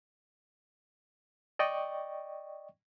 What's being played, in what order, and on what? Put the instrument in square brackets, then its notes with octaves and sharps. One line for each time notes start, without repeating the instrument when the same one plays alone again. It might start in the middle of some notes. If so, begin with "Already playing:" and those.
[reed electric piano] D5 D#5 G5 C#6